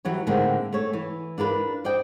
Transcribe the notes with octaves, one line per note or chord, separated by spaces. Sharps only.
E3 F#3 G3 C#5
A2 D3 D#3 G#3 A#3 C4
A3 C#5
E3
D4 F4 A#4 B4
C5 D5 D#5 G5